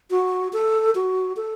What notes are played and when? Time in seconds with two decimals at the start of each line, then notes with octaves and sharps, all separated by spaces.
0.11 F#4
0.53 A4
0.95 F#4
1.37 A4